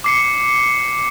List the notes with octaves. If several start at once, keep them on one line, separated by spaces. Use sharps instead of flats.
D6 C7 C#7